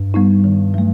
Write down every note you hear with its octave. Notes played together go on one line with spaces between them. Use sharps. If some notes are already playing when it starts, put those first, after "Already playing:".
Already playing: G2
G3 B3 D#4
D#3
F#3 A3